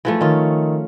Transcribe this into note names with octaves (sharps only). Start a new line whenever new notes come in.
E3 F3 A3
D#3 C#4 F4